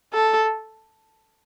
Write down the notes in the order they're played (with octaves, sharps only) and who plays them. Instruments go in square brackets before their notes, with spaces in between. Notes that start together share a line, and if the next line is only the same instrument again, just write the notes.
[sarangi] A4